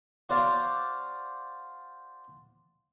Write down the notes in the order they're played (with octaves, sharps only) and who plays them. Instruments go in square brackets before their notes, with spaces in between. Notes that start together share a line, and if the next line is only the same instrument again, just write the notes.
[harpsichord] F#4 C5 D5 F5 A#5 D6